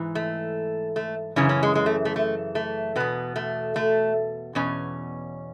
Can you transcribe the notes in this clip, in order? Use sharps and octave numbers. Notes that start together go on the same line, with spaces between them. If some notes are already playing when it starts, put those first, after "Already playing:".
Already playing: G#2 E3
A3
A3
F#2 C#3 E3 C#4
C#4
G#3
G#3
A3
A3
A3
A3
E2 B2 B3
A3
A3
E2 B2 C#4